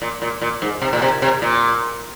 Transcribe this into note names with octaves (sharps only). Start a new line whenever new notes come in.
A#2
A#2
A#2
G#2
C3
A#2
C3
C3
A#2